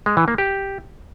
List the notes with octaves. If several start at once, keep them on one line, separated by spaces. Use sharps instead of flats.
G#3
E3
A#3
G4